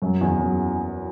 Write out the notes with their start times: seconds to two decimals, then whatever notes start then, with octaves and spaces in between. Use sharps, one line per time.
0.02 F#2 F#3
0.21 E2 E3
0.39 F#2 F#3